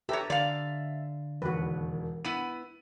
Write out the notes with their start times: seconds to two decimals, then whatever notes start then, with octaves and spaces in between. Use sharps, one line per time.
0.09 G4 A4 B4 C#5 E5 A#5
0.30 D3 D5 F5
1.42 E1 D#2 F#4 B4
2.25 B3 E4 D#7